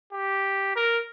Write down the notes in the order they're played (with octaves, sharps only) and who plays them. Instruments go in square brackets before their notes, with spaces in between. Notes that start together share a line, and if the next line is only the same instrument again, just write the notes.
[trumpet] G4
A#4